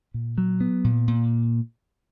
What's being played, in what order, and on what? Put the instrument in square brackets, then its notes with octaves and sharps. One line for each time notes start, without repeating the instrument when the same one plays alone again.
[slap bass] A#2
F#3
B3
A#2
A#2